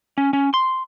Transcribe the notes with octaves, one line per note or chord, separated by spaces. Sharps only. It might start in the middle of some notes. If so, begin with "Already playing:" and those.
C#4
C#4
C6